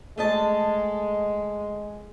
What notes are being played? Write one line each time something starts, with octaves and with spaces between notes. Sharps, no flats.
G#3 A3 D#5 A5